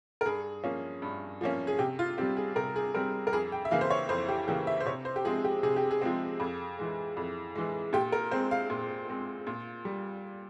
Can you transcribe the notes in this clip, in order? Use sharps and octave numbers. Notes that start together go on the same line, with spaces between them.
A#4
G2 G#4
F3 A#3 C#4
G2
F3 A#3 C#4
G#4
C3 G4
F4
G3 C4 G4
G#4
C3 A#4
G#4
G3 C4 A#4
A#4
F2 G#4
G5
E5
C#3 E3 A#3 F5
C5
C#5
F2 C5
G4
C#3 E3 A#3 G4
E5
C5
C3 C#5
C5
G4
F3 G#3 C4 G#4
G4
C3 G#4
G4
G#4
F3 G#3 C4
F2
E3 G#3
F2
E3 G#3
A#2 G4
A#4
G#3 C4 C5
F5
A#2
G#3 C4
A#2
G3